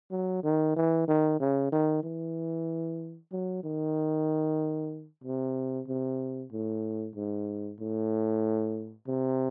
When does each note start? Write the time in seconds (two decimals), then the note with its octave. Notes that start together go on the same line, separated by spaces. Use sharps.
0.11 F#3
0.44 D#3
0.76 E3
1.08 D#3
1.40 C#3
1.72 D#3
2.03 E3
3.32 F#3
3.63 D#3
5.24 C3
5.88 C3
6.52 A2
7.16 G#2
7.80 A2
9.07 C3